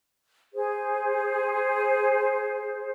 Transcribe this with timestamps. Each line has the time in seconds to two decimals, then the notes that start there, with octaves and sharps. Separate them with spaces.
0.54 G#4 C5